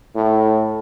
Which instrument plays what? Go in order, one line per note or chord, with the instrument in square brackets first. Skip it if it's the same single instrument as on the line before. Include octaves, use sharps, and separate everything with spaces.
[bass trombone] A2